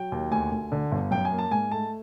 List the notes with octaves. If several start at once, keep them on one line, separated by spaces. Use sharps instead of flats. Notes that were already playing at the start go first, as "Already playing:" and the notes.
Already playing: F#3 G5
D#2
D2 G#5
D2
D3
G1
F#2 G5
G#5
A#3
A5
G#2 G#5
A3 A5